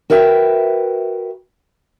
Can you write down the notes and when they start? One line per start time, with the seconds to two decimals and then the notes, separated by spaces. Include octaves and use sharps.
0.10 F#4 A#4 B4 E5 G5